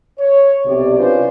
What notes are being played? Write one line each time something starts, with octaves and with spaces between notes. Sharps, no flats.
C#5
B1 C3 D5
C#4 D4 F4 B4 C5